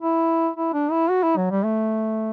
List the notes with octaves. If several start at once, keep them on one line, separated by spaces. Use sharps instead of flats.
E4
E4
D4
E4
F#4
E4
F#3
G3
A3